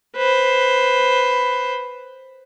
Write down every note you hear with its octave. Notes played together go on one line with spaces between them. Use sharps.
B4 C5